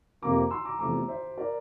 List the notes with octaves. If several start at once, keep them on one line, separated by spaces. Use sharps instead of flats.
F2 C3 F3 A#3 A#5 D6
C6 E6
A#5 D6
E2 C3 F3 A3 A#5 D6
C5 E5
A#4 D5